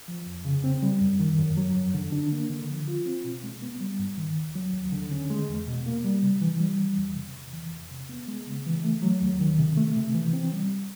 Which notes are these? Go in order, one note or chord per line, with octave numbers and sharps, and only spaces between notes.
F3
F2
C#3
C4
G3
F#2
D#3
F#2
F#3
F#2
D3
D4
A#3
D3
F3
F4
C4
B2
G#3
B3
G3
G2
D#3
D#2
F#3
D#2
D3
C#4
G#3
E2
B2
A#3
G3
C3
E3
G3
E3
E2
C3
E2
E3
E2
C3
B3
G#3
C#3
E3
A3
F#3
D#2
D#3
C3
A3
C3
E3
C4
G3